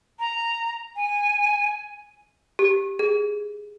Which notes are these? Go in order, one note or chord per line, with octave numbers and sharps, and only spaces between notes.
A#5
G#5
G4
G#4